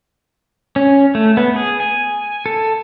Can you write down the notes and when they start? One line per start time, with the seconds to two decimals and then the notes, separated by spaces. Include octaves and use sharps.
0.76 C#4
1.15 A3
1.37 B3
1.56 G#4
1.80 G#5
2.46 A4